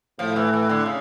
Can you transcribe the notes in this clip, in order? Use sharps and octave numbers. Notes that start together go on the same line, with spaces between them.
A2 F3
E3
E3
D3
C#3